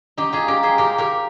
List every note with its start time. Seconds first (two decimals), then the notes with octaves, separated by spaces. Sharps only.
0.17 D#4 G4
0.33 F4 G#4
0.48 G4 A#4
0.63 G#4 C5
0.78 G4 A#4
0.98 G4 A#4